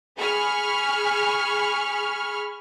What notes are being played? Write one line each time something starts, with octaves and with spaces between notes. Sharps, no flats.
G#4 B5 C#6 F6